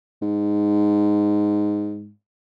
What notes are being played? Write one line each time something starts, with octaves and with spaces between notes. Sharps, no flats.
G#2